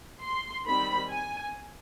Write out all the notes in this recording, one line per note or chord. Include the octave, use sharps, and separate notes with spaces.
C6
D#3 G3 C4 B5
G#5